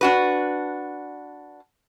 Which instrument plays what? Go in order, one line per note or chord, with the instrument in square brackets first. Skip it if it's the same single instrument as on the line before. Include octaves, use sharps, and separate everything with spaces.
[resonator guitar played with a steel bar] D4 F#4 B4